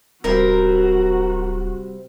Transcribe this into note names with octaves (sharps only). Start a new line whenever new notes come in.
D1 C3 G3 C4 F#4 A#4